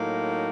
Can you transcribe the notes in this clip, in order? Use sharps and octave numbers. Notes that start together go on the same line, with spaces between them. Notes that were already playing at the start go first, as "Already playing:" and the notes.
Already playing: A2 F#3 A#3 D#4